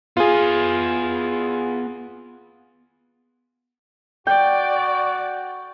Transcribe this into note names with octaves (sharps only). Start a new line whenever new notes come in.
B3 F4 G#4 G#5
F#4 D5 G5